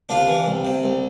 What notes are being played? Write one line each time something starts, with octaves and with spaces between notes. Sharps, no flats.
C2 D4 F4
E3
C2
C3
C2